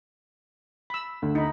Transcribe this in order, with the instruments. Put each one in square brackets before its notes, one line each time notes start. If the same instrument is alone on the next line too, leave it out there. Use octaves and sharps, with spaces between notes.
[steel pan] B5 E6
[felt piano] D2
[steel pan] D#4 B5